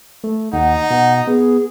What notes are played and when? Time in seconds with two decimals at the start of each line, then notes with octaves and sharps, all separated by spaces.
0.24 A3
0.53 D#2 D#4 F#5
0.90 B2 F#5
1.27 B3 G#4